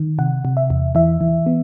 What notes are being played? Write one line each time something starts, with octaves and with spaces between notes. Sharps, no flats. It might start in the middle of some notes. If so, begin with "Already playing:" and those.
Already playing: D#3
C3 F#5
C3
E5
E2
E3 E5
E3
B3